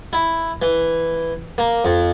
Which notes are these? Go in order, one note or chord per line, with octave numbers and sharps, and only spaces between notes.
E4
E3
A#3
F2